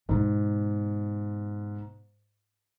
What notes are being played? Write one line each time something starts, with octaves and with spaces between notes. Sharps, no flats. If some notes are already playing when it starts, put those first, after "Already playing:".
G#2 B2 B3